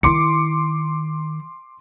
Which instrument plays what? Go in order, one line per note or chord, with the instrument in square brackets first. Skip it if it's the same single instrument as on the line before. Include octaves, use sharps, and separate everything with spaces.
[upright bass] D#3 E4 [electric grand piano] C6 D6 C#7